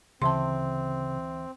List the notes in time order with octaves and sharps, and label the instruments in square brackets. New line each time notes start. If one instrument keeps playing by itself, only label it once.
[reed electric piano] D2 E3 E5 [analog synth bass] C#3 [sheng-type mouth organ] C4 [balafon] A5 C6